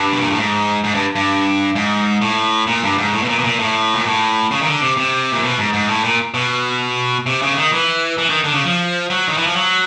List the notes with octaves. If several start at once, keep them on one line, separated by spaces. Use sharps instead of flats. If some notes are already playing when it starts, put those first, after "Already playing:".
Already playing: G2
B2
A#2
A2
G#2
G#2
G2
G2
G#2
A2
A#2
G2
G#2
A2
B2
A#2
B2
A#2
A2
A#2
A2
C#3
D#3
D3
C3
C3
A#2
B2
G#2
G#2
A2
A#2
B2
C3
C#3
D3
D#3
E3
E3
D#3
D3
C#3
F3
F#3
D#3
E3
F3
F#3